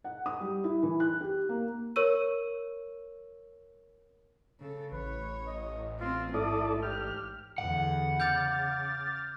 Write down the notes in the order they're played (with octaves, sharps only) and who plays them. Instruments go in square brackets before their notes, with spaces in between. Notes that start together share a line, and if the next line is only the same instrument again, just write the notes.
[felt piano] F#5
D#6
G3
E4
E3
F#6
G4
A#3
[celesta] A#4 C#5 C#6 E6 D#7
[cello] C#3 A4
[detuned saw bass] A1 [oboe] B4 [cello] C#5
[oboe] D#5
[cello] C4 [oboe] F4
[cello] G#2 [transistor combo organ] E4 A4 D5 [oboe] D#6
[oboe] G4 [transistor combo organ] F6
[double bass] E2 D3 [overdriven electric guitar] F#5
[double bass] C#3 [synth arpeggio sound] D6 F6 A6 [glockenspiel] G6